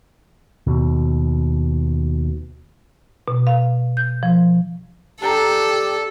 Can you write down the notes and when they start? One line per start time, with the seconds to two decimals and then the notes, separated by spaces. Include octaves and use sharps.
0.67 D#2 B2
3.28 B2
3.47 F5
3.97 G6
4.23 F3
5.22 D4 G4 A4 G5 A#5